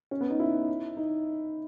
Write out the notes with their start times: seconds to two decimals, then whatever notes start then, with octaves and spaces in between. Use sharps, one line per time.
0.11 C#4
0.21 B3
0.30 D#4
0.40 E4
0.97 D#4